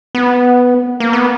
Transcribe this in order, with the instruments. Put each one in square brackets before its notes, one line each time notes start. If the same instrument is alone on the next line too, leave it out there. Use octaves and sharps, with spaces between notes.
[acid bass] B3
A#3
B3